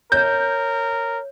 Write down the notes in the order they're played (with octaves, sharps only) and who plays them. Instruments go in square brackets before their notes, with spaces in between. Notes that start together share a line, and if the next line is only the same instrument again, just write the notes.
[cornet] A#4 [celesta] C#5 [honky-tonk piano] G6